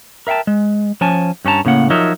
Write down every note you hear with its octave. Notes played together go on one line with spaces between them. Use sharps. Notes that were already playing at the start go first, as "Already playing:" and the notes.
A#4 E5 F5 G5 A5
G#3
F3 C#4 G#5 A5
G2 C#4 F#4 A5 A#5
A2 C#3 A#3 F#5
F3 F#3 D#4 A#4 C#5 E5